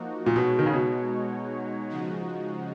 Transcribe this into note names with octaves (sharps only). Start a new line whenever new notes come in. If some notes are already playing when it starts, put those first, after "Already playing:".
Already playing: F3 A#3 D#4 F#4
A#2
B2 G#3 D#4 F#4 C#5
D#3
C#3
B2
C#3 F3 G#3 D#4 F#4